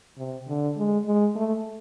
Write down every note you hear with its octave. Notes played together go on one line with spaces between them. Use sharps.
C3
D3
G#3
G#3
A3